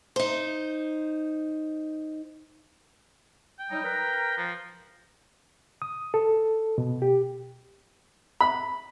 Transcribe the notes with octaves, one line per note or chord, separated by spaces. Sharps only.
D#4 C5
G5
F#3 G3 D#4
A#4 B4 A#5
F3
D#6
A4
B2
G4
B5